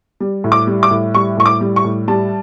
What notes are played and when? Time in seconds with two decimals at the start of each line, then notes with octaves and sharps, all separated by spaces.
0.20 G3
0.44 A2
0.52 D6
0.67 G3
0.83 D6
0.91 A2
1.14 G3 C#6
1.37 A2 C#6
1.46 D6
1.61 G3
1.76 C#6
1.84 A2
2.08 G3 A5